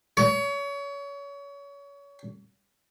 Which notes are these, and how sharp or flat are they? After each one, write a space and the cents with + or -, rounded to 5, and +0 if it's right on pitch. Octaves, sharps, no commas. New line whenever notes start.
C#5 +30